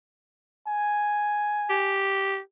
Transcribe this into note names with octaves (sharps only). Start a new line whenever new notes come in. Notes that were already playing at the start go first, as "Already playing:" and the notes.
G#5
G4